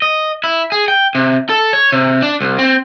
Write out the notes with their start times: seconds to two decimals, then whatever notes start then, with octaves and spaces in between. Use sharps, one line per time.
0.02 D#5
0.44 E4
0.72 G#4
0.88 G5
1.15 C3
1.49 A4
1.73 C#5
1.92 C3
2.22 D4
2.41 C2
2.59 C4